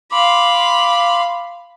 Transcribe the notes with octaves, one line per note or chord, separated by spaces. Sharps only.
F5 B5 C6 D6